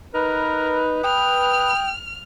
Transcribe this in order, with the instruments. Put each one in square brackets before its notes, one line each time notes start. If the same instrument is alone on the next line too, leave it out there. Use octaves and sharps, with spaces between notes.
[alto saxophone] D#4 [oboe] A#4 [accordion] B4
[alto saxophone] G5 [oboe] D#6 [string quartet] F6